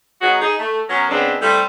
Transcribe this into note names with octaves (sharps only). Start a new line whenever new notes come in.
F#3 B3 D#4 F#4 G#4
D#4 G#4
A3
F#3 B3 C#4 A#4
C#3 G#3 B3 C4 D4
G3 A3 C4 E4 A4